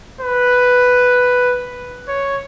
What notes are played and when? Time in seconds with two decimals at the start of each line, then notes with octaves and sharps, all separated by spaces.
0.21 B4
2.08 C#5